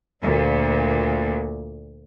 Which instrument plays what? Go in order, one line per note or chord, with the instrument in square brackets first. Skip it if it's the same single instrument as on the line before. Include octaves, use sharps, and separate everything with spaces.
[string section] D2 A#2